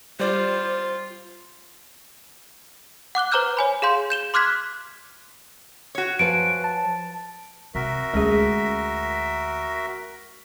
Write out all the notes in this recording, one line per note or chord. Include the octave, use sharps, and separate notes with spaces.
G3 F4 C5 D5
F#5 D6 F#6 G7
B4 C5 A#5 D6 F6 G6
C#5 G#5 B5
G#4 F5 C6 G6
G6 E7 G7
C6 D6 F6 F#6 G#6 B6
F#4 C#5
F3 B4 G#5 D7
A5
C3 F#4 A#4 E5
D2 G#3 C#4 G#4